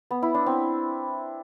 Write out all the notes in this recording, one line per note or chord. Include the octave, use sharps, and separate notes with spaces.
B3
E4
D4
C4